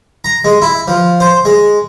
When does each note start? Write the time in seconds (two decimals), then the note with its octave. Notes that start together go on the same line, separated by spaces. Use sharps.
0.24 A#5
0.45 G#3
0.62 E4
0.88 F3
1.20 C5
1.45 G#3